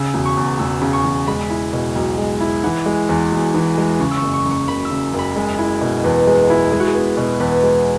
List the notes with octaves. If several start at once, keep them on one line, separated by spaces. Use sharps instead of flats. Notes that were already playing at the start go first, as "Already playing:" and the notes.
Already playing: C#3 E6
E1
C#6
E2
E1 E6
C#3
C#6
E1
G#3 B5
E4
B2
B1
G#3
E4
E3 F#5
G#3
E2
E1
E3
G#3
C#3 C#6
E6
C#6
F#1
C#6
F#2
C#6
F#1 B5
E6
C#3
F#1
B5
G#3
E4
B2
E2 B4
G#3
E4
G#3 G#4
F#4
G#4
B3
B2
E2 B4
G#3